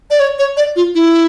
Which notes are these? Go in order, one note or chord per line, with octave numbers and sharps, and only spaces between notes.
D5
C#5
C#5
D5
F4
E4